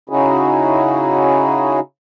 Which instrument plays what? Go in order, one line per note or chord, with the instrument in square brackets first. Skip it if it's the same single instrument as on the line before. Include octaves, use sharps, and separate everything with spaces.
[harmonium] C#3 C#4 D#4 E4 F#4 G#4